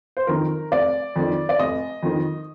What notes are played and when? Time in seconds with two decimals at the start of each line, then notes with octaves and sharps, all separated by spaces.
0.17 C5
0.27 F2 D#3 A#4
0.71 F1 D5
1.16 F2 D#3
1.49 D5
1.59 F1 D#5
2.03 F2 D#3